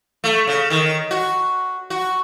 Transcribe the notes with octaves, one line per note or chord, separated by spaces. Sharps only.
A3
C#3
D#3
F#4
F#4